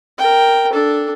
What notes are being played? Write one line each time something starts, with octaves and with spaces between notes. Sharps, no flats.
A#4 G5
D4 A4